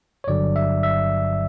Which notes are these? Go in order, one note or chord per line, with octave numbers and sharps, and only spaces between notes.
C#5
G1 G2 D3 F#3 D5
E5
E5